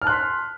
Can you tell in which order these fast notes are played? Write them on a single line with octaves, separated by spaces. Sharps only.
F6 A5 F#6 C6 B6